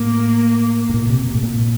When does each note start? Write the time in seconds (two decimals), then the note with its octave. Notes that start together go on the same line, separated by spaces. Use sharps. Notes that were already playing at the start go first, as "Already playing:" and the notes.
Already playing: A2 A#3
0.89 A2
0.94 A#2
1.09 C3
1.27 B2
1.35 A2
1.43 A#2